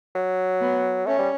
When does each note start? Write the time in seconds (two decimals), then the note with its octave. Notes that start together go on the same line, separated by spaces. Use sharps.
0.15 F#3
0.60 B3
1.06 A3 C#4
1.18 G3